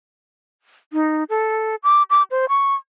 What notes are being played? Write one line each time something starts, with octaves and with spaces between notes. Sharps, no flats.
D#4
A4
D6
D6
C5
C#6